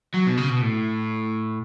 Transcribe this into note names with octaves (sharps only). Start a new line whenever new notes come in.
F#3
B2
C#3
B2
A2